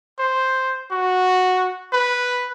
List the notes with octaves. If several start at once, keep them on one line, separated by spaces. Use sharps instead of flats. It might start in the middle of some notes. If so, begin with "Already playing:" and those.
C5
F#4
B4